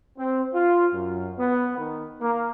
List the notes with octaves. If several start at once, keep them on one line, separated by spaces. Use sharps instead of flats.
C4
F4
F#2
B3
D#3
A#3